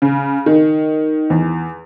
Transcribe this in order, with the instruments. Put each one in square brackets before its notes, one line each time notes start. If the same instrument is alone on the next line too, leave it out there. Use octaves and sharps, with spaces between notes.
[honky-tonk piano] C#3
D#3
E2